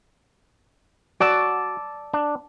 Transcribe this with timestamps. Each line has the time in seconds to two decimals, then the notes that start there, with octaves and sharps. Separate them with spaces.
1.20 F#4 D5 A5 E6
2.14 D4